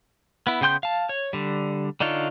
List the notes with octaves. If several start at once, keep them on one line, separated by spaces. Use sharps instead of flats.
B3 E4
C#3 B3 G5 C6 G6
F5 A5
C#5
D3 G3
D3 D4 D#4 F4 C#5